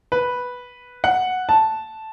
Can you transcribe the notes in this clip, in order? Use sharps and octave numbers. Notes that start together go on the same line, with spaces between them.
B4
F#5
A5